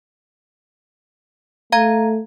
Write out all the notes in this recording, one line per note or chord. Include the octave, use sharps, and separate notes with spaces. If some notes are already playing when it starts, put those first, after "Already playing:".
A3 F5 A#5 G#6